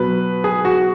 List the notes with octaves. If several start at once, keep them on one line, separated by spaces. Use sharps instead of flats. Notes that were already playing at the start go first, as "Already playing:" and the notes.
Already playing: B2 F#3 B4
G#4
F#4